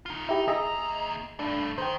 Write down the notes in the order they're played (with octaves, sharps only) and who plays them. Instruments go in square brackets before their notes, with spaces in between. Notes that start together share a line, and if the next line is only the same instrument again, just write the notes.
[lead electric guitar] D#4 F4
[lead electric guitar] D#4 [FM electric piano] E4 G4
[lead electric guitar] D#2 A#5 [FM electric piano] G#4 D#5 E5
[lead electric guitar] G2 A3 [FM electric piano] D4
[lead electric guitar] D#3 [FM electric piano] C5 G5